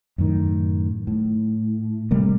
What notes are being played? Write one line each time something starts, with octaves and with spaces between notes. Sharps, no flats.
F#2 A2 D#3
A2
C3 G3 A3 A#3